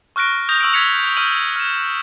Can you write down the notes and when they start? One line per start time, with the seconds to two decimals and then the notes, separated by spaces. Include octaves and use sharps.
0.16 C#6 F6 F#6 A#6 D7
0.49 D#6 G6 A#6 F7
0.60 C#6 E6 A#6 D7
0.73 E6 F6 G#6 B6 C#7 F7
1.16 C#6 F6 G6 D#7 F#7
1.56 F6 E7